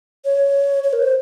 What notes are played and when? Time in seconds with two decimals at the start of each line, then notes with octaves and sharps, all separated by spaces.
0.25 C#5
0.83 C#5
0.93 A#4
1.02 C5